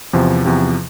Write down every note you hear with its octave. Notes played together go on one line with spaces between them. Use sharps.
E2 C3 F3
E2 C3 F3